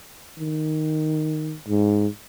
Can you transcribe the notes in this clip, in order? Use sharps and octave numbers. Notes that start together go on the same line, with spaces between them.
D#3
G#2